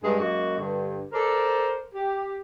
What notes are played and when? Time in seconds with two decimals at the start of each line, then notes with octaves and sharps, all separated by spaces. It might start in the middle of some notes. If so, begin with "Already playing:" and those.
0.03 G2 G#3
0.20 F#2 G#3 A#3 F#4
0.58 G2 D3
1.12 A4 A#4 C5 D5
1.93 G4